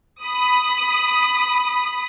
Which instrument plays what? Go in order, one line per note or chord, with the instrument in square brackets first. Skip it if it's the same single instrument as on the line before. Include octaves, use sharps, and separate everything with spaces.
[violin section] B5 D#6